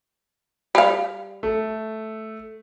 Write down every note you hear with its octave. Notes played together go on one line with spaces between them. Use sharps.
G3 F5
A3